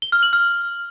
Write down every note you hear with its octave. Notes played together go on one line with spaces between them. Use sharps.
G7
F6
F#7
F6